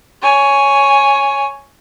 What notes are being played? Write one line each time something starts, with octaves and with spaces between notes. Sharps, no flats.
C#5 G#5